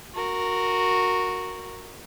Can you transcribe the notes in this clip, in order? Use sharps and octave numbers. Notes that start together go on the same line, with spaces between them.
F#4 A#4